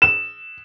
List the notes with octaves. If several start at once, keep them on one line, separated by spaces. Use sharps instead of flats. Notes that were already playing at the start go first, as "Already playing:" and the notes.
E7